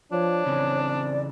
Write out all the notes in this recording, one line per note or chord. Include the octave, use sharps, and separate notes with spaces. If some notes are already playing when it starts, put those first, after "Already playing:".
F3 D4 C#5
C#3 E3 C4
D5